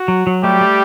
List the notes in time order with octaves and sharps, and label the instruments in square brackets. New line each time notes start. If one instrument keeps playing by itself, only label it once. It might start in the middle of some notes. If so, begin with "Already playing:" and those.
Already playing: [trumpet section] F#4
[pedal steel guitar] F#3
F#3
[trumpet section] G3 G4 [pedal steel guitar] A3
[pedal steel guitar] A3